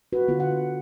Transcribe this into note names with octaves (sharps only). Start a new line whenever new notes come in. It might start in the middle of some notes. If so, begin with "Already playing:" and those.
F#4 B4
D3 B3 F4
F#5